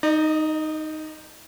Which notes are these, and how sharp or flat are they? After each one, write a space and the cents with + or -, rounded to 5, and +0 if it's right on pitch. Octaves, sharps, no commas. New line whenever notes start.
D#4 +0 D#5 -45